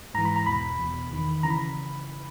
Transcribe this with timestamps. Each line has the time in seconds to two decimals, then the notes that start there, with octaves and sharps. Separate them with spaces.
0.14 G#2 E3 A#5
0.25 B5
0.36 A#5
0.46 E2 B2 B5
0.79 E2 B2
1.11 E2 D#3
1.43 C#3 E3 A#5
1.50 B5